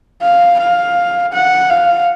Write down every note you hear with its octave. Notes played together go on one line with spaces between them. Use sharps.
F5
F5
F#5
F5